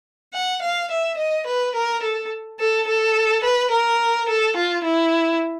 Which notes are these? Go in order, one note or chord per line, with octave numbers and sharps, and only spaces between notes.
F#5
F5
E5
D#5
B4
A#4
A4
A4
A4
B4
A#4
A4
F4
E4